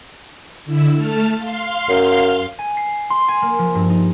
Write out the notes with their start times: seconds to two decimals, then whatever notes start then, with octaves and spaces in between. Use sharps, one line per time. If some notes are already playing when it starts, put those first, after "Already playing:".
0.65 D3 E4 E6
0.95 A3 A5 F6
1.35 F5 C6
1.89 F#2
2.59 G#5
2.77 C7
3.10 C6
3.28 G#5
3.42 A#3
3.59 F3
3.75 G2
3.90 D#4